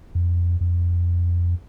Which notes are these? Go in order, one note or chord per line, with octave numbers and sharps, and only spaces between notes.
F2
F2